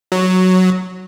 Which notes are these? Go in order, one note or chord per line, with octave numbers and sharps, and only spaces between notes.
F#3